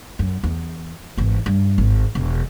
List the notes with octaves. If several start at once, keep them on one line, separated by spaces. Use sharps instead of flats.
F#2
E2
G#1 E3
G2
G#1
E1